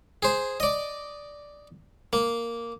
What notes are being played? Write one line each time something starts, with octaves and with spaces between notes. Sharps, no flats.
G#4 C5
D5 D#5
A#3